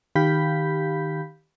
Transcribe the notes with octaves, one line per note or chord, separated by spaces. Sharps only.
D#3 G4 F5 B5 G6 B6